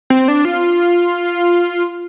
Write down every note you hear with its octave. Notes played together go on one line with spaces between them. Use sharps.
C4
D4
F4